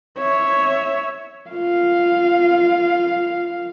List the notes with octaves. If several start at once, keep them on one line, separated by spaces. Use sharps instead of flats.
C#5 E5
F4 F5